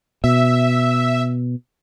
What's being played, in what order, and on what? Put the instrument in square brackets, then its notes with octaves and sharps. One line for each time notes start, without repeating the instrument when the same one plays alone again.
[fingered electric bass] B2 [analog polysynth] E5